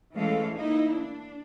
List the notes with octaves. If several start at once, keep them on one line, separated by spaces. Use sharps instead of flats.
E3 G#3 A3 C#4 A4 F5
A#3 D#4 E4
D4